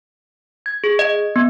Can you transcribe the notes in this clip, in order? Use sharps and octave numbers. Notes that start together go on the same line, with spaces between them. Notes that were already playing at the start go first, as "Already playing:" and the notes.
G#6
G#4
D#5
B3